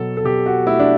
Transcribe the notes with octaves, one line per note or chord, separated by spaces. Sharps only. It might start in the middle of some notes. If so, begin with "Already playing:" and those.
Already playing: B2 F#3 A4
A4
B2 G4
F#4
A3 E4
D4